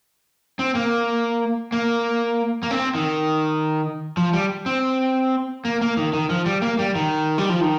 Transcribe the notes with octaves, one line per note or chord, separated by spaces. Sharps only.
C4
A#3
A#3
A#3
C4
D#3
F3
G3
C4
A#3
A#3
D#3
D#3
F3
G3
A#3
G3
D#3
G3
F3
D#3